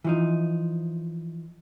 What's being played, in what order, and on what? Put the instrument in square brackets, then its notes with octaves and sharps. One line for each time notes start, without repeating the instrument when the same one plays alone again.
[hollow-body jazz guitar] E3 F3 D#4